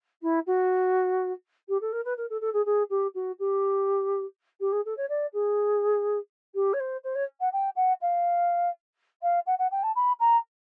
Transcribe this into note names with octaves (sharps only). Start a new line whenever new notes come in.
E4
F#4
G4
A4
A#4
B4
A#4
A4
A4
G#4
G#4
G4
F#4
G4
G4
G#4
A4
C#5
D5
G#4
G4
C#5
C5
C5
C#5
F#5
G5
F#5
F5
F5
F#5
F#5
G5
A5
B5
A#5